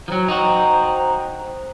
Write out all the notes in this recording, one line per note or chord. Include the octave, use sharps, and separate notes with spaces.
F3 F#3 C5 G5 A#5
D#4 F#4